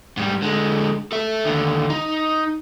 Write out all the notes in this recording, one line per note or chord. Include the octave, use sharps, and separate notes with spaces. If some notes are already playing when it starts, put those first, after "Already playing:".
G#2 G3
D3 G#3
A4 E5
D#2 D3
D#4